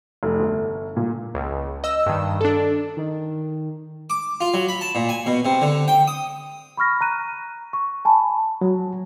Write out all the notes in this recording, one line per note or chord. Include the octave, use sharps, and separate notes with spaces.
F1
G1
A#2
C#2
D#5 E6
G2 D#3
D4 A4
D#3
D6
F4
F#3
B5
A5
A#2
G#5
B2
C3
D3
G5
D#6
B5 C#6 F6 A#6
A#5 F#6 D#7
C#6
G#5 A5 B5
F#3